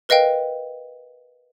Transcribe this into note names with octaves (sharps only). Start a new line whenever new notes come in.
A#4 B4 D#5 F5 G5